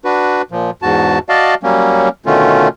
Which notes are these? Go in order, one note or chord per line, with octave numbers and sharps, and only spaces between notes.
D4 F#4 B4
A#2 F3
E2 G#2 F#4 A5
F#4 D5 D#5 F5 A5
F#3 G3 A#3 C#4
B2 D3 D#3 A3 C#4 F4